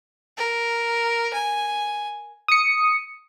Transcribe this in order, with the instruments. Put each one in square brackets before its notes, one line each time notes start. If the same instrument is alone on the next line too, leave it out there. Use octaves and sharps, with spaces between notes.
[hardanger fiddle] A#4
G#5
[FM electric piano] D#6 C#7